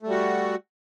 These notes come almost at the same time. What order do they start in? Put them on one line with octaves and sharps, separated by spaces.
A3 G3 F#4